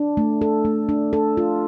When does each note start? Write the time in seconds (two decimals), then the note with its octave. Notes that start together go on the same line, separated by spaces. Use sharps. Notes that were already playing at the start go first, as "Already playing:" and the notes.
Already playing: D4
0.17 A3
0.41 A4
0.65 A3
0.89 D4
1.13 A4
1.37 F4